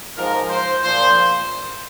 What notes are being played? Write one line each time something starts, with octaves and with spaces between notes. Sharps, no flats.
G#2 F3 A#4
C5
A#2 F3 C5